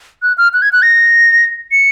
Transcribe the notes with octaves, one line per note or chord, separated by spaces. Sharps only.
F#6
F6
F#6
G#6
F#6
A#6
C#7